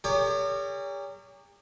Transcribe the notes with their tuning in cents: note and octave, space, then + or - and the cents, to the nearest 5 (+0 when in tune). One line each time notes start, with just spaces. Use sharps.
G4 +45 A#4 -35 C#5 +40